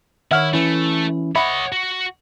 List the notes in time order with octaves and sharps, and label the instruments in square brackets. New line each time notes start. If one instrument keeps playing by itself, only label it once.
[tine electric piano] D#3 C#5 [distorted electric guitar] E4 [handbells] E5 F#5 F6
[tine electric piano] E3 C#4 E4 [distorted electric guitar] A3
[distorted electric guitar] C#5 D#5 [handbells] E5 B5 [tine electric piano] F#5 C#7
[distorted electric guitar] F#4